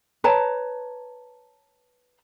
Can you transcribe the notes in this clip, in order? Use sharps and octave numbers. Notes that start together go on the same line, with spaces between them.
B4 C#5 A5 A#5